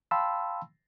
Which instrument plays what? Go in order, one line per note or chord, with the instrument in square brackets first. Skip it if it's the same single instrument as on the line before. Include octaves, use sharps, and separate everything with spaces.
[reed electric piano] F5 G5 A5 B5 C6 E6